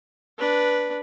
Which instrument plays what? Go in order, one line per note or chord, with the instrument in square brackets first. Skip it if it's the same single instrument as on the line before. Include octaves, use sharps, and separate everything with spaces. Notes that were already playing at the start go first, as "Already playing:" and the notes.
[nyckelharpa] D4 B4